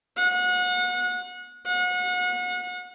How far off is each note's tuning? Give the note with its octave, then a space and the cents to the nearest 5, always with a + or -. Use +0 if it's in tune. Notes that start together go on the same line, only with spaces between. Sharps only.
F#5 -30
F#5 -35